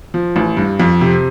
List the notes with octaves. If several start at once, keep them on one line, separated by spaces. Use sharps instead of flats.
F3
A1
G2
F2
C3